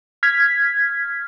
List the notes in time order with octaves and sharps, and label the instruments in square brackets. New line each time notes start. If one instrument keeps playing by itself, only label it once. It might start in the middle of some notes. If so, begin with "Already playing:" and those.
[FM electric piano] F6 G#6 B6